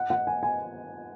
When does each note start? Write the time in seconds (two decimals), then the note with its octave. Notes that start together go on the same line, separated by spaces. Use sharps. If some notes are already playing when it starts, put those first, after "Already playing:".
Already playing: F#5
0.10 F#5
0.27 G#5
0.43 G#5